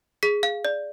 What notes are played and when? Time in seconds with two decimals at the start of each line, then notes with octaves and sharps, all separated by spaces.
0.23 G#4 B6
0.43 F5
0.65 D5